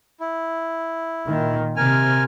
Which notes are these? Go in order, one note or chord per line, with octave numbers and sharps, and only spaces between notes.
E4
A#2 D#3
C3 A#4 G#5 F6